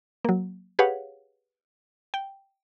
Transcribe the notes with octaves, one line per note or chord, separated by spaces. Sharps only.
F#3 A#3
G4 G#4 B4 C#5 F5 F#5
G5